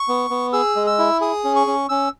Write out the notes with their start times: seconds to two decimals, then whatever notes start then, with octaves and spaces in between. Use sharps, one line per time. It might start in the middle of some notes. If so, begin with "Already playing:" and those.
Already playing: C#6
0.08 B3
0.30 B3
0.53 G#4 E6
0.76 G#3
0.87 E6
0.99 E4
1.21 G#4 D#6
1.44 C#4
1.56 C#6
1.67 C#4
1.89 C#4 E6